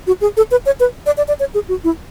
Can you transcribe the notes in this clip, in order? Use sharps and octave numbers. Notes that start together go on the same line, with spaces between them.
F#4
G#4
A4
B4
C#5
B4
D5
D5
D5
C#5
G#4
F#4
E4